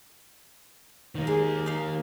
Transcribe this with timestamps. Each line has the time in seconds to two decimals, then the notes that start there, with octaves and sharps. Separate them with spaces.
1.15 D#3 A#3
1.27 G#3
1.66 D#4 F5